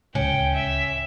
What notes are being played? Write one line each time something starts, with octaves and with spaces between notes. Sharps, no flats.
D1 C#2 C#4 G5
E5